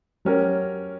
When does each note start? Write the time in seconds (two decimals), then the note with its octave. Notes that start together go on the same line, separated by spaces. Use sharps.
0.25 F#3 C#4 G4 A#4